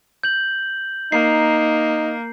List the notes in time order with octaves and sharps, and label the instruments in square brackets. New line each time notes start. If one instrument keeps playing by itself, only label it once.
[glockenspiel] G6 F#7
[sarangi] A#3 [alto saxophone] D#4 [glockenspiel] C7